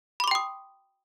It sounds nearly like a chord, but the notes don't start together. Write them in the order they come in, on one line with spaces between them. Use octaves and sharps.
B5 D6 C6 G5 D#6